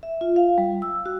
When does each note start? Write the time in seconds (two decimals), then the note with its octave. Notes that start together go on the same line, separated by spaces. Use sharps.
0.03 E5
0.21 F4
0.36 F5
0.58 G3
0.82 E6
1.06 F#4